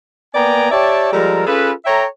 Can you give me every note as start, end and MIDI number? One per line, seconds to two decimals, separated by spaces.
0.34 0.71 58
0.34 0.71 59
0.34 0.71 74
0.34 0.71 79
0.34 0.71 80
0.34 0.71 82
0.71 1.10 67
0.71 1.10 73
0.71 1.10 74
0.71 1.10 76
0.71 1.10 79
0.71 1.10 81
1.13 1.44 53
1.13 1.44 55
1.13 1.44 56
1.13 1.44 69
1.13 1.44 70
1.46 1.71 61
1.46 1.71 65
1.46 1.71 68
1.46 1.71 69
1.46 1.71 71
1.85 2.04 69
1.85 2.04 73
1.85 2.04 76
1.85 2.04 79
1.85 2.04 82